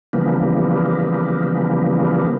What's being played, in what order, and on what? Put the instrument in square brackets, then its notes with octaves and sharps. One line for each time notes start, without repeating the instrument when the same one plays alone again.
[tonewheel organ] C#3 E3 F3 G3 A#3 B3